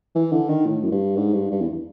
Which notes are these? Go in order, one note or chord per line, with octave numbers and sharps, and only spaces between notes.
E3
D3
D#3
A2
F#2
G2
G#2
G2
G2
E2